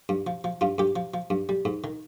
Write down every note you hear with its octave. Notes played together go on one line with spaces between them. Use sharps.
G2
F3
F3
G2 F4
G2 G4
F3
F3
G2
G3
G#2
D#3